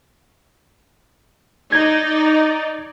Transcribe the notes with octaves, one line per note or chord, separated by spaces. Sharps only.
D#4 D5 G#6